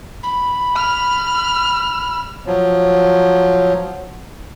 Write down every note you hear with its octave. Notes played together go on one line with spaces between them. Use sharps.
B5
F6
F3 F#3